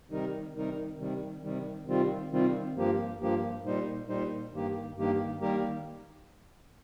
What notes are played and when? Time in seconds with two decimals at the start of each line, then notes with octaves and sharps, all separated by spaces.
0.10 C3 D#3 G3 D#4 A#4
0.54 C3 D#3 G3 D#4 A#4
0.98 C3 D#3 G3
1.42 C3 D#3 G3
1.87 C3 D#3 G3 C4 F4
2.31 C3 D#3 G3 C4 F4
2.75 G2 F3 A#3 G4
3.19 G2 F3 A#3 G4
3.63 A#2 G3 D#4 C5
4.08 A#2 G3 D#4 C5
4.52 G2 D#3 A#3 G4
4.96 G2 D#3 A#3 G4
5.40 D#3 G3 A#3 G4 A#4